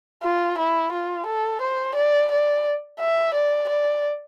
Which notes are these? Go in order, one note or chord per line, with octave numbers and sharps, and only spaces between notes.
F4
E4
F4
A4
C5
D5
D5
E5
D5
D5